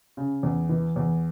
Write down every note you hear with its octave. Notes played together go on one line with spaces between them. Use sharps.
C#3
E2
E3
E2